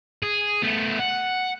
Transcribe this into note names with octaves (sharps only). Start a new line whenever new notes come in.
G#4
A3 B3
F#5